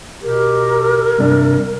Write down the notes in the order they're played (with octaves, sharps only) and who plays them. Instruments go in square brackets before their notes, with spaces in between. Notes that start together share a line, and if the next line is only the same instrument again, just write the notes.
[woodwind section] B2 G4 [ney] A#4
[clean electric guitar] G2 C3 D4